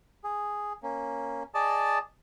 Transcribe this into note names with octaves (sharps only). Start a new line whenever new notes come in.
G#4
A#3 C#4
G#4 D5 D#5 A5